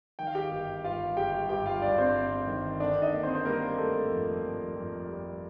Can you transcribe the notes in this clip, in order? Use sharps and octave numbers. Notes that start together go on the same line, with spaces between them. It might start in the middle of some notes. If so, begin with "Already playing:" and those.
D#3 G5
F5
G4 G5
G1
G2 F4 F5
G1 G4 G5
G2 G4 G5
F4 F5
G2 D4 D5
C4 C5
G1
D#3
D3 D4 D5
D#4 D#5
A#3
C4 C5
C5
G3 A#3 A#4
G3 A3 A4
F2
F2
F2
G3